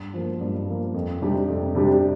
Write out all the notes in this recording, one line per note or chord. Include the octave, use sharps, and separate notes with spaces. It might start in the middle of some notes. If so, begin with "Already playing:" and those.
Already playing: G2
F3 A#3
G2
F3 A#3
F2
C3 G3 D4 G4
F2
C3 G3 D4 G4